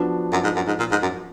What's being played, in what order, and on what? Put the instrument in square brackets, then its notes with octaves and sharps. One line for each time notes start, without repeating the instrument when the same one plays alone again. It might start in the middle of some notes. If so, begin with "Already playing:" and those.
Already playing: [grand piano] F3 B3 D4 F#4
[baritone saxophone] F#2
G#2
F#2
G#2
A#2
G#2
F#2